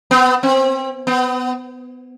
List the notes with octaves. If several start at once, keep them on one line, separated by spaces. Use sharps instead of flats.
B3
C4
B3